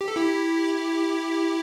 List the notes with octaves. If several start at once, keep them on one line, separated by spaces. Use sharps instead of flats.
G4
A4
E4 G4